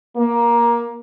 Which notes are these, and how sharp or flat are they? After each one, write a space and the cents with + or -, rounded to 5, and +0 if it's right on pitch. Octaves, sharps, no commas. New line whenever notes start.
A#3 +15